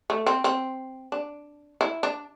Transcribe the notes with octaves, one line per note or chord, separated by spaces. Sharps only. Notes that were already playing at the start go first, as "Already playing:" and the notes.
A3
C4
C4
D4
E4
D4